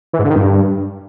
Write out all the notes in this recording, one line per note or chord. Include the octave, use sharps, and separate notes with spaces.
E3
G#2
D3
D#3
G2